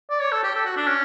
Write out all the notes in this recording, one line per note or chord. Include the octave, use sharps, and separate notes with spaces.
D5
C#5
A4
G4
A4
F#4
D4
C#4